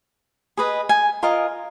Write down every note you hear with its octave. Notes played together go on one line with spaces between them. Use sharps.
G#4 B4 D#5
G#5
F4 A#4 D#5